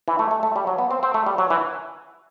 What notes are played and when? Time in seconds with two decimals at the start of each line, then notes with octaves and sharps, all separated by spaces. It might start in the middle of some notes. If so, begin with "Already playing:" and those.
0.08 E3
0.19 A3
0.31 A3
0.43 A3
0.56 G3
0.67 F#3
0.78 B3
0.91 C4
1.03 C4
1.14 A3
1.26 G3
1.38 F#3
1.50 E3